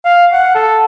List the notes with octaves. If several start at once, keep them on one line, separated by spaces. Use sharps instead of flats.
F5
F#5
A4